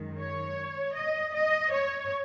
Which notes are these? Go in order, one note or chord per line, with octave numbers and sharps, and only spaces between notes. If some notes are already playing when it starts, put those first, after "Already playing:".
Already playing: F#2 D#3 G#3
C#5
D#5
D#5
C#5